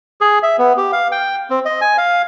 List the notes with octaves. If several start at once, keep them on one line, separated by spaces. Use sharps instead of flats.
G#4
E5
B3
G4
F5
G5
C4
D#5
G#5
F5